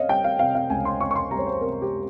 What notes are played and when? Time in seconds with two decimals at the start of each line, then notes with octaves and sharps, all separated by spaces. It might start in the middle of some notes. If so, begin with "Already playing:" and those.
Already playing: C#4 C#5 D#5 F5
0.09 G3 G5
0.24 F5
0.39 C3 F5
0.55 F5
0.70 C#2 G#5
0.85 C6
1.00 C#4 C#6
1.11 C#6
1.16 C6
1.31 G3 A#5
1.39 C#5
1.46 C5
1.61 C3 A#4
1.82 G4